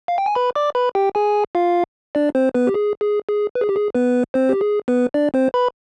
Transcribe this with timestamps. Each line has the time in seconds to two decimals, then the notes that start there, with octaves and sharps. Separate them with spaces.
0.08 F5
0.18 G5
0.26 G#5
0.35 B4 B5
0.55 D5 D6
0.75 B4 B5
0.95 G4 G5
1.15 G#4 G#5
1.55 F4 F5
2.15 D4 D5
2.35 C4 C5
2.54 B3 B4
2.67 G4
2.74 G#4
3.01 G#4
3.29 G#4
3.55 B4
3.61 G#4
3.69 G4
3.76 G#4
3.95 B3 B4
4.34 C4 C5
4.49 G4
4.61 G#4
4.88 B3 B4
5.14 D4 D5
5.34 C4 C5
5.54 B4 B5